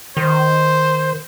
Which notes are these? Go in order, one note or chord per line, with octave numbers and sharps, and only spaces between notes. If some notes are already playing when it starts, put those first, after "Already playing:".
D#3 C5